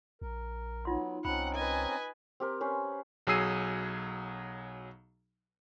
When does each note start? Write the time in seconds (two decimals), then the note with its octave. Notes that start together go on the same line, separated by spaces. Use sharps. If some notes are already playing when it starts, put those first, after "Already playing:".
0.22 A#1 A#4
0.85 F#3 B3 D#4 F4 C6
1.25 C2 C4 C#4 D#4 F#5 B5
1.54 B4 D#5 G#5
2.40 C4 G4 A#4
2.61 C#4 B4 C5
3.27 B1 F#3 G#4 E6 C7 D#7